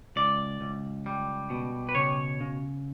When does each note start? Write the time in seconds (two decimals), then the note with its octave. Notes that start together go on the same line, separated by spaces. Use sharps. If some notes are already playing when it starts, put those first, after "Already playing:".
0.16 C#2 D5
0.61 C#2
1.06 G3
1.50 B2
1.89 B4
1.95 C#3 C#5
2.40 C#3